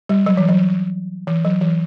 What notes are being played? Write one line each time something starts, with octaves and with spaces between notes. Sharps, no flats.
G3
F#3
E3
F#3
E3
F#3
E3